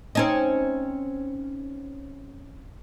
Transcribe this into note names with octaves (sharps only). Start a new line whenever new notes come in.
C4 C#4 D#4